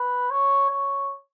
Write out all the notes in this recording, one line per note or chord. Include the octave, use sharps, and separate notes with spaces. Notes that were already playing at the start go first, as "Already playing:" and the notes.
Already playing: B4
C#5
C#5